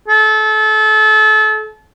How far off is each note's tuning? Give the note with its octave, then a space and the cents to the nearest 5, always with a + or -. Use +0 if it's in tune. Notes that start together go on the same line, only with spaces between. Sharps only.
A4 -30